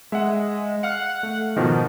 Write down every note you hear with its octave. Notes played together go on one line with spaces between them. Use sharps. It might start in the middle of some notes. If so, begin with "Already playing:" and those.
G#3 E5 F#5
F5 F#5 F6
A3
G#2 B2 D#3 F3